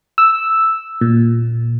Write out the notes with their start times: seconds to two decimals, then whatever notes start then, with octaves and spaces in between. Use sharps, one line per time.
0.18 E6
1.01 A#2